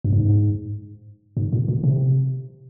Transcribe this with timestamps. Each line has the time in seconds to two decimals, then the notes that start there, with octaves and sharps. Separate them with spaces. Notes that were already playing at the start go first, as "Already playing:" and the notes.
0.04 G2
0.13 G#2
1.37 G#2
1.52 A#2
1.68 A#2
1.84 C3